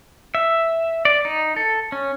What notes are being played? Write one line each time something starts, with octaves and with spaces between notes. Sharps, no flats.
E5
D5
D#4
A4
C#4